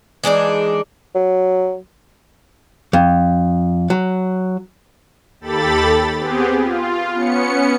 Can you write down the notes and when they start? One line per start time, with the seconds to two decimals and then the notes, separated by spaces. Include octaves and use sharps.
0.24 E3 G#3 D4 D#4
1.15 F#3
2.93 F2
3.90 F#3
5.40 D#2 G4 A4 B5 A6
6.18 B3 C4 G4 G#4
6.61 F4
7.13 B3 C#4 C#7